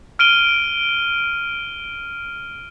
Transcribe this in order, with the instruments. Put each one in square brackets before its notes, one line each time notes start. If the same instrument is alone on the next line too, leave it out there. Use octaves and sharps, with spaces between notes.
[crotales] F6 D7 D#7 G7